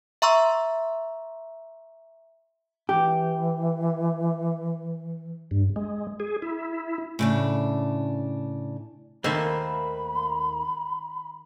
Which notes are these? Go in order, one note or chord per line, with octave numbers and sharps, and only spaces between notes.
E5 A#5 C6 C#6 E6
E3 G4
G2
G#3
G#4
E4
A2 C#3 D4
D#2 D#3 A3 A#3 C5 E5 B5